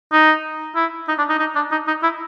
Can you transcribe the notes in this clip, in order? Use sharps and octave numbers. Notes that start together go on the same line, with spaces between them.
D#4
E4
D#4
D4
D#4
D#4
D4
D#4
D#4
E4